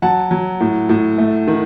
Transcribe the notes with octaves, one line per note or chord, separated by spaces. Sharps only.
F#3 F#5 A5
F#3
A2
A2
A3
D#3